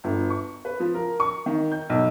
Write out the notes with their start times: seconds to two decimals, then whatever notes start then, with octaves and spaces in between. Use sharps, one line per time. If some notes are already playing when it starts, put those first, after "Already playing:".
0.04 G1
0.30 C#6
0.65 B4
0.80 F3
0.95 A#4
1.20 C#6
1.46 D#3
1.72 G6
1.90 B1